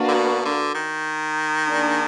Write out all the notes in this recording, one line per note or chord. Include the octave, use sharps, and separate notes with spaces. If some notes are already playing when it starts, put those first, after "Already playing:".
Already playing: A#3 D4 F#4 B4 F5
D3
B2
D3
D#3
A#3 D4 G#4 D5